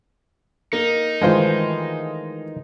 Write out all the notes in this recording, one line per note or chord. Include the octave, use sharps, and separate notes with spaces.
A#3 D#4
D#3 E3 G#3 A3 F4 C5